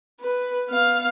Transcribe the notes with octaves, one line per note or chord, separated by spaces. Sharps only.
B4
B3 F5